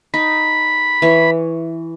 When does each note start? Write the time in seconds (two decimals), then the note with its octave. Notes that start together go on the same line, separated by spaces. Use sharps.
0.14 D#4 B5
1.02 E3 C#5